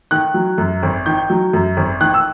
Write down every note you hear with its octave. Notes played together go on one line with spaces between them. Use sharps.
D#3 F#6
F#3
F#2
G#1
D#3 G6
F#3
F#2
G#1
D#3 F#6
E6